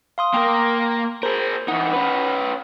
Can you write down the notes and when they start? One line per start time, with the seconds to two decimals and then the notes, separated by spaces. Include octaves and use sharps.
0.18 F5 C6 D#6
0.34 A#3 A#4 G5 C6
1.23 G#4 A#4 C5
1.68 E3 D#4 F#5
1.93 C#4 B4